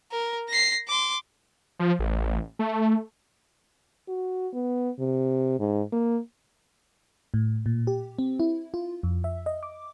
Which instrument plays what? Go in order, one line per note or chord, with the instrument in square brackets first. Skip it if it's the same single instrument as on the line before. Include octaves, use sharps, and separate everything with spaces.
[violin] A#4
A#6 C7
C6 D6
[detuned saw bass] F3
A1
A3
[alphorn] F#4
B3
C3
G#2
A#3
[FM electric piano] A2
A#2
G4
C4
E4
F4
F2
E5
D#5
D6